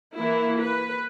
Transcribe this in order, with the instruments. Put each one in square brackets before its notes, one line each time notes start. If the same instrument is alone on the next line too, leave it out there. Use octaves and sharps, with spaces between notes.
[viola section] E3 A#3 E4
B4